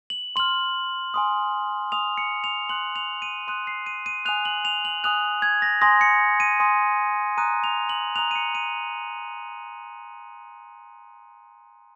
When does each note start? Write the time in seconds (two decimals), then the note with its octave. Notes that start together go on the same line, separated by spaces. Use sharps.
0.10 F#7
0.36 C6 F6 F#7
1.14 G#5 C6 D#6
1.92 G#5 C6 D#6 F7
2.18 C#7
2.44 F7
2.69 C6 D#6 F#6 F#7
2.96 F7
3.22 D#7
3.48 C6 D#6 F#6 D#7
3.67 C7
3.86 D#7
4.06 D#7
4.25 G#5 D#6 F#6 F7
4.45 F#7
4.65 F7
4.85 F#7
5.04 G#5 D#6 F#6 F7
5.42 G#6
5.62 A#6
5.82 G#5 C6 D#6 A#6
6.01 C#7
6.40 D#7
6.60 G#5 C6 D#6
7.38 A#5 D#6 F#6 D#7
7.64 F7
7.89 F#7
8.16 A#5 D#6 F#6 F7
8.31 D#7
8.35 C#7
8.55 D#7